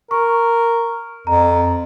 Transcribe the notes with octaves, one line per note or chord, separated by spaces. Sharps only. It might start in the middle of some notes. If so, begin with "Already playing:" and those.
A#4 C#6
F2 A#5